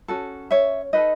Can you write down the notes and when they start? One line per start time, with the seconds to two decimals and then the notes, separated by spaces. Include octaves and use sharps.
0.08 C#4 F#4 A4
0.51 C#5 E5
0.93 D#4 A4 B4 D#5